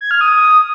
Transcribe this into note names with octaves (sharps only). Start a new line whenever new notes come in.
G#6
F6
D#6